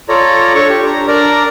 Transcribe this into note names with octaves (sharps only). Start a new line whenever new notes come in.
F4 A4 C#5 D5 A#5
D4 A4 C#5 C#6
G4
D4 A#5
D4 A#4 D5 A#5